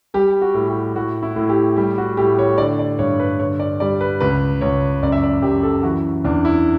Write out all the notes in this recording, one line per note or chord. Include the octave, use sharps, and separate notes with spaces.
G3 G4
F#4
A2
G4
A2 F#4
E4
A2
G4
G3 G4
F#4
A2 G4
C#5
D3 D5
D5
G2 C#5
B4
D3 C#5
D5
G3 D5
B4
C#2 B4
C#2 C#5
F#2 D5
E5
D5
F#2 G4
A4
E3 F#4
E2 D4
E4